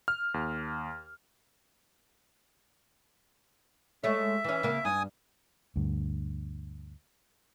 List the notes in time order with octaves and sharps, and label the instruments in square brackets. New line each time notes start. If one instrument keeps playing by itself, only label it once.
[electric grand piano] F6
D#2
[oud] G#3 A3 C#5 [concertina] E5
[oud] E3 C#4
C#3 A#3
[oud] G2 [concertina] G#5 D#6
[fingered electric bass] D2 G2